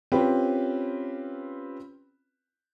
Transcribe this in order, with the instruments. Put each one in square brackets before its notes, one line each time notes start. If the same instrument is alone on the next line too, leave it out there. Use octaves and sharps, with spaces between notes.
[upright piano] C4 C#4 F4 G4 B4